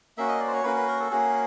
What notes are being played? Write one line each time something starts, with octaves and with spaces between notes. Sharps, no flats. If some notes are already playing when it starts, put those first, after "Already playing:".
A#3 C#4 F#4 E5
D#5
D5
C5
C#5
A#3 C#4 F#4 B4
B4
A#4
A4
A#3 C#4 F#4 G#4